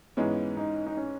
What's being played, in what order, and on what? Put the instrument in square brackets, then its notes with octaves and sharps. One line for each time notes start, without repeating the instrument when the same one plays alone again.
[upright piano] G#2 E3 G#3 C#4 [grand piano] B3
[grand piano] D#4
D#4
C#4